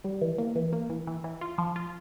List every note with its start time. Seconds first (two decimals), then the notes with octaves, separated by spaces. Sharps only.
0.04 G3
0.21 E3
0.38 A#3
0.56 E3
0.73 A#3
0.90 E3
1.07 E3
1.24 E3
1.41 F4
1.58 F3
1.76 F4